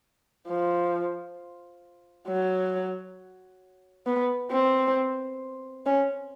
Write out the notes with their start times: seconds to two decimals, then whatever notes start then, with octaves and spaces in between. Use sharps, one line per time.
0.48 F3
2.27 F#3
4.06 B3
4.51 C4
5.86 C#4